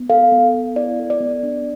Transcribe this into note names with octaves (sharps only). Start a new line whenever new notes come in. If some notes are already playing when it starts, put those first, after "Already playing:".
Already playing: B3
A4 F5
B3
B3
E4 D5
A4
D5
B3
D4